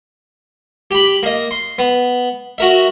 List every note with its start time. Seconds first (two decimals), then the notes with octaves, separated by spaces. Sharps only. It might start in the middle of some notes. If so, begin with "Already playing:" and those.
0.91 G4 B5
1.23 A#3 D#5
1.51 C6
1.79 B3
2.58 F#4 A#4 E5